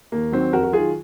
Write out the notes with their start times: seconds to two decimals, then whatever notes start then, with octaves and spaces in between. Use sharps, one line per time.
0.12 D#2 A#3
0.32 D#3 F#3 C4
0.53 F2 F#4 A#4
0.63 F#4
0.73 D#3 F#3 F4 G#4